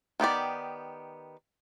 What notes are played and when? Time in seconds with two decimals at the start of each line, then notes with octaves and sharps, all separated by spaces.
0.20 D#3 B3 G4 D5